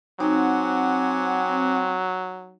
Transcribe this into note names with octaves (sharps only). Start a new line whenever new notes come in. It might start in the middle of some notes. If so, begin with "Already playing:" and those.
F#3 C4 D#4 F#5 G#5 D6